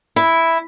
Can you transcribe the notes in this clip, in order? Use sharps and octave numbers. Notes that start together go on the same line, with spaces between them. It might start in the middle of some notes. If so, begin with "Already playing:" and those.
E4